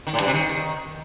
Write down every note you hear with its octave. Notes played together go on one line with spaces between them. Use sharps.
D#3
A2
G2
C3
D#3